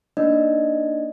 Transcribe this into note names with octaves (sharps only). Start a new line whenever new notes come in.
A#3 D4 D#4 D5 D#5